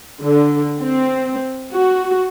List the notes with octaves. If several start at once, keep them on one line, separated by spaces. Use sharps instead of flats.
D3
C4
F#4